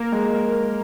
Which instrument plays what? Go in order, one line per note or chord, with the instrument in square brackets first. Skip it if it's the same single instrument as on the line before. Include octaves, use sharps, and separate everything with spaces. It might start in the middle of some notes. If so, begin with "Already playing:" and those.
Already playing: [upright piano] A#3 [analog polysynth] A#4
[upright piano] G#3